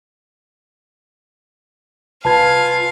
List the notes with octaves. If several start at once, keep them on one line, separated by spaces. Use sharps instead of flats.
C2 F4 B4 F5 G#5 A5 G#6